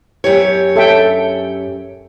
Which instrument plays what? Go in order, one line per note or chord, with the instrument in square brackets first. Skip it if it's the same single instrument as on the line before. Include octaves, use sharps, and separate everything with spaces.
[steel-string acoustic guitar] F#2 G4 C#5
[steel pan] A4 E5 G5